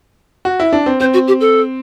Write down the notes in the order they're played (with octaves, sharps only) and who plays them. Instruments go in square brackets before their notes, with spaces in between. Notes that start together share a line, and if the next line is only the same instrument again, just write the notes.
[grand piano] F#4
E4
D4
C4
[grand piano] C4 [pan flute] C5
[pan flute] F#4
G4
A4